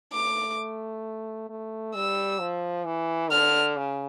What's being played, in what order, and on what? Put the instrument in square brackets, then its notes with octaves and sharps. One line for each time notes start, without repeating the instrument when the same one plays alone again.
[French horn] A3 [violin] D6
[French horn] A3
[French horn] G3 [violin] E6
[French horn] F3
E3
[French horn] D3 [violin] F6
[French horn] C#3